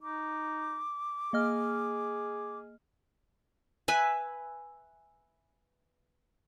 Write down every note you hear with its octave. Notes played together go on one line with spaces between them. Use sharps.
D#4 D6
A#3 G#4 D#5 F6
B4 E5 G#5